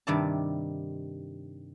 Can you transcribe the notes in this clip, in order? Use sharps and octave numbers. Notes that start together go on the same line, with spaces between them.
G2 C3 D#3 D5 E5 A5